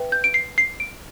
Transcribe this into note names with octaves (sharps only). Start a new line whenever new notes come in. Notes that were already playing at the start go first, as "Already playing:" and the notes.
Already playing: B4 E5 G5
G6
D7
C7
C7
D7